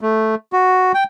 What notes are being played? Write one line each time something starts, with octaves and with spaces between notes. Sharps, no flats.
A3
F#4
G5